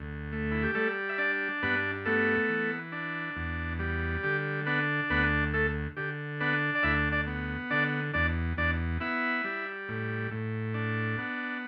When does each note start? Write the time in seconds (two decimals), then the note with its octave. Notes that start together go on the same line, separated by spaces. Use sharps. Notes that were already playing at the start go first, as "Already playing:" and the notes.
Already playing: D2
0.32 A3
0.51 E4
0.63 G4
0.75 G3 A3 A4
1.09 E5
1.18 D4 D5
1.63 G2 B3 B4
2.05 A3 B3 A4
2.49 E3
2.92 D4
3.36 E2
3.79 G3
4.23 D3 G4
4.66 B3 D4 B4
5.10 D2 B3 B4
5.53 A3 A4
5.97 D3 G4
6.40 B3 D4 B4
6.75 D5
6.83 D2 E4 E5
7.12 D4 D5
7.27 B3
7.70 D3 D4 D5
8.13 E2 D4 D5
8.57 E2 D4 D5
9.00 B3 E4 E5
9.44 G3
9.88 A2
10.31 A2
10.74 D4
11.18 B3